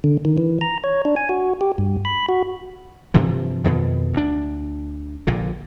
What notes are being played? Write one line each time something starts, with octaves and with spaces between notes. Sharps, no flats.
D3
D#3
E3
A#5
C#5
D4
G#5
F#4
G4
G2
B5
F#4
G2 C3 E3 F3
F2 B2 D#3
D2 D4
A#1 A#2 D3